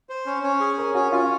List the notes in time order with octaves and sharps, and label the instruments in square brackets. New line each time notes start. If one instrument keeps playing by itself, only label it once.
[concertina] C5
C#4
C#4
G#4
[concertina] C#4 [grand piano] A#4
[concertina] C#4 [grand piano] F#4
[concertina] C#4 [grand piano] F4